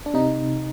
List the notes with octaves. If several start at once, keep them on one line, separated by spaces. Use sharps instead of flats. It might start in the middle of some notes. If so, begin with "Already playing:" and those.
D4
C3 D#4